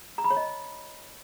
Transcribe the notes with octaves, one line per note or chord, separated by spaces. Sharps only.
A#5
B5
C#5
D#5